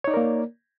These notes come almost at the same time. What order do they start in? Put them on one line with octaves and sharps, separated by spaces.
C#5 D#4 D5 A#4 A#3